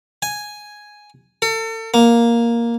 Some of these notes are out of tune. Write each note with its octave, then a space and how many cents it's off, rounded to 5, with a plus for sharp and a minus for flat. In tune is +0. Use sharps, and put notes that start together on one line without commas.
G#5 +0
A4 +35
A#3 +5